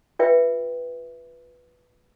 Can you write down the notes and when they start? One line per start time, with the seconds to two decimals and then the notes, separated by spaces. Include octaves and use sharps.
0.19 F4 B4 E5 G5